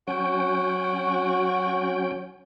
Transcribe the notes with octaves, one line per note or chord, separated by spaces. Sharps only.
F#3 C#4 F#4 G5